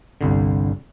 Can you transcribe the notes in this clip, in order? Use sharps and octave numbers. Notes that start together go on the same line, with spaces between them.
G1 C2 D3